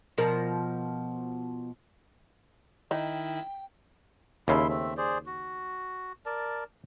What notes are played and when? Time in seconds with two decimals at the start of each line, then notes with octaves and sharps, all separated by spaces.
0.18 B2 F3 A#4
2.91 D#3 D#4 E4 G5
4.48 D#2 C#3 E4 E5 C6
4.69 A3 C4 E5
4.97 G#4 C5 D5
5.26 F#4
6.26 A#4 D5 A5